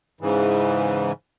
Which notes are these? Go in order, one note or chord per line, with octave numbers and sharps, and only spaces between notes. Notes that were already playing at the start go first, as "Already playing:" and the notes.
G#2 C#3 E3